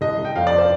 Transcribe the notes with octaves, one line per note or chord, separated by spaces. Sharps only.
C2 D#5
C2
G5
F2 F5
D5
C5